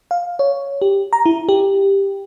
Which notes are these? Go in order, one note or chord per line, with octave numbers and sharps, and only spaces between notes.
F5
C#5
G4
A#5
E4
G4